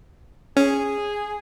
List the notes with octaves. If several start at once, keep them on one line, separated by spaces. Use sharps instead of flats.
C#4 G#4